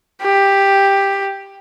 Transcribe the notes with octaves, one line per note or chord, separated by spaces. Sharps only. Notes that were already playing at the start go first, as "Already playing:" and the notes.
G4